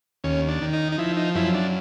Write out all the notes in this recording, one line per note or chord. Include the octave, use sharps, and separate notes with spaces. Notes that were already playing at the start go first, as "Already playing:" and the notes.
D#2 C#4
D4
D#3
D#4
D#4
F3 E4
D#4
F#2 E4
D4